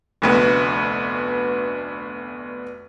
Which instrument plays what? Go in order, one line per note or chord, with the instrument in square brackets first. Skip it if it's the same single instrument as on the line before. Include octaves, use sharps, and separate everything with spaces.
[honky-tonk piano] F1 D2 B3